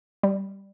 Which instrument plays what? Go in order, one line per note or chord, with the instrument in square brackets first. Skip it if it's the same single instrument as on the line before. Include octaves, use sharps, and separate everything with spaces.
[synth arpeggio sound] G3